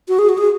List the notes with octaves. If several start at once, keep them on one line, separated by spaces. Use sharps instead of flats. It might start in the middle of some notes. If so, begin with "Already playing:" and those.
F#4
G#4
F#4
G#4